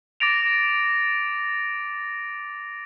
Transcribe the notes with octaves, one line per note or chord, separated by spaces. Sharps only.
D6 A6 A#6 D7 F7